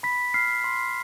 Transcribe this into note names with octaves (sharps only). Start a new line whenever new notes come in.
B5 B6
F6 C7
C6